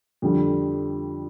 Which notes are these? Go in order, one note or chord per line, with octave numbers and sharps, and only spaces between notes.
F2 D3 G3